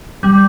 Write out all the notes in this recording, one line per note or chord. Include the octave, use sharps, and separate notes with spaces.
G3